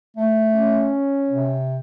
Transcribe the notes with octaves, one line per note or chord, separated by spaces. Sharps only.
A3
C#4
C3